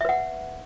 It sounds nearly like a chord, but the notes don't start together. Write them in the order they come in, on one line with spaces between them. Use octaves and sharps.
E5 B4 F#5